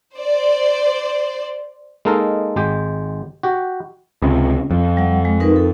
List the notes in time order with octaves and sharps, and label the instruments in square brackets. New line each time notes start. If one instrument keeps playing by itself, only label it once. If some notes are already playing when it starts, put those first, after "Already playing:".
[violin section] C5 D5
[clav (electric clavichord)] G#3 A#3 D#4 A4 A#4
G#1 G#3 G4 G5
F#4 G4
[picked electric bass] C#2 C3
F2
[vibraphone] G3 F#5
G#3
D#4 A#4 B4
A4